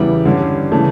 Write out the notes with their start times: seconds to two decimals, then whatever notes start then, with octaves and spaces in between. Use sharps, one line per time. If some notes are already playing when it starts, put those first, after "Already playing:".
Already playing: E2 C#3 G3 B3 E4
0.25 G2 D3 G3 C#4
0.72 C#3 E3 A3